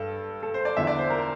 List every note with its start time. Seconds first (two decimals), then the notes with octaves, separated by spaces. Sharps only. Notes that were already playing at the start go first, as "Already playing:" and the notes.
Already playing: G2 A4
0.43 A4
0.54 C5
0.65 D5
0.77 E2 D3 F3 E5
0.87 D5
0.98 C5
1.10 A#4